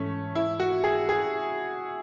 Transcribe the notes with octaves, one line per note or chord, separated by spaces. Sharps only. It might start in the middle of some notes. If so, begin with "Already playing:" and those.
Already playing: G#2 E3 A3 C#4
E4
F#4
G#4
G#4